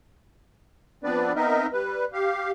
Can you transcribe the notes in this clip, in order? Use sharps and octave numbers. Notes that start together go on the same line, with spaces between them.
F3 B3 C4 D4 B4 D5
B3 C4 D#4 A#4 D#5 E5
G3 B4
G4 F5